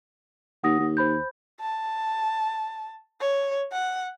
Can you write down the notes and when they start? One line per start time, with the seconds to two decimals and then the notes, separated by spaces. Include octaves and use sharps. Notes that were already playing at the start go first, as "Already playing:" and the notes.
0.64 D#2 F#5 D#6 A#6
0.79 D#2
0.97 C5 B5 G6
1.60 A5
3.20 C#5
3.72 F#5